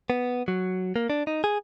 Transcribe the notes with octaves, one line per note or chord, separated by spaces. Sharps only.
B3
F#3
A#3
D4
D#4
G#4